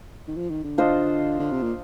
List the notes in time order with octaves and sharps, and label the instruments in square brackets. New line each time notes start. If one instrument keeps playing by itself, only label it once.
[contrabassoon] D#3
F3
D#3
D3
[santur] D4 F4 C5 D#5
[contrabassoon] D3
C3
A#2